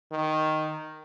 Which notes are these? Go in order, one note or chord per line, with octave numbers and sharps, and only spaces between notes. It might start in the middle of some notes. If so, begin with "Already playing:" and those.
D#3